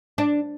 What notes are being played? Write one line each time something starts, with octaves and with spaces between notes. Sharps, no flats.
D4